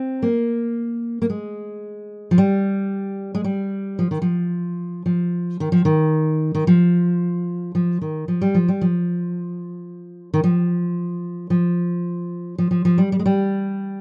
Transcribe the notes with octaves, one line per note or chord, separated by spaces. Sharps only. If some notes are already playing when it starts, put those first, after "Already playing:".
Already playing: C4
A#3
A#3
G#3
F3
G3
G#3
G3
F3
D#3
F3
F3
D#3
F3
D#3
D#3
F3
F3
D#3
F3
G3
F3
G3
F3
D#3
F3
F3
F3
F3
F3
G3
G3
G#3
G3